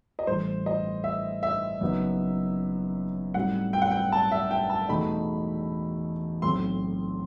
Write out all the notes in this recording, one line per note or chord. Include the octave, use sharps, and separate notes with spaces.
D#5
A1 A2 G3 C5
D#5
E5
E5
F#1 F#2 F#3 B3 D#4
A2 G3 C4 D#4 F#4 F#5
G5
F#5
G5
A5
E5
G5
A5
E1 E2 B2 A3 D#4 B5
B1 A2 F#3 C4 C6